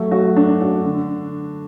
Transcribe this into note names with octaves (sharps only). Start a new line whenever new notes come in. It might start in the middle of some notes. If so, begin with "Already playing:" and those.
Already playing: F#3 A3
F#4
D4
F#4
D3